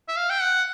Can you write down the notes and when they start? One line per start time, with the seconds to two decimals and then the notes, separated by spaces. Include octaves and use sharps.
0.08 E5
0.17 F5
0.30 G5
0.41 F#5